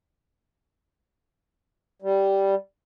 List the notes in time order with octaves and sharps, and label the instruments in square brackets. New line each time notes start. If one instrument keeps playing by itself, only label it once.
[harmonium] G3